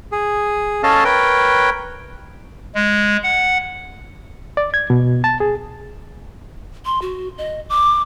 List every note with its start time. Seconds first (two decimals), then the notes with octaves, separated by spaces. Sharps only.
0.12 G#4
0.83 C#4 A4 D#5 F5 A5
1.05 A#4 B4 C#5 G5
2.75 G#3
3.23 F#5
4.57 D5
4.74 G#6
4.90 B2
5.24 A5
5.40 G#4
6.85 C6
7.02 F#4
7.38 D#5
7.70 D6